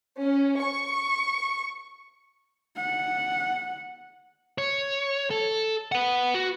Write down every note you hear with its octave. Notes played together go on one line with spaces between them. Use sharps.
C#4
C#6
F#5
C#5
A4
B4 F#5
F#4